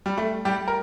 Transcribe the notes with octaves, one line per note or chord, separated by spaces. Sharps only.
G3
A3
G3 G4
A#4